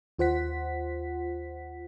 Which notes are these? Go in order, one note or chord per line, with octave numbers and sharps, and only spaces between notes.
D#2 F4 C5 F#5 B6